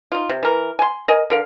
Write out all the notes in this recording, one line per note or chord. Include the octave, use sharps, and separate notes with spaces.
D#4 F4
C3
E3 A#4
G#5 C6
A#4 D#5 G#5
D3 A#4 F5